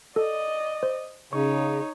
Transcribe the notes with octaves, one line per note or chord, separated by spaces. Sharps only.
A4 D5 D#5
C5
C#3 D#4 C#5 C#6